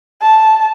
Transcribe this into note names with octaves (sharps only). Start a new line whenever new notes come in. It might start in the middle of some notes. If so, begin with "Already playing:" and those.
A5